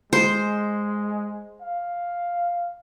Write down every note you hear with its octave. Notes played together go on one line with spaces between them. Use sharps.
G#3 C5
F5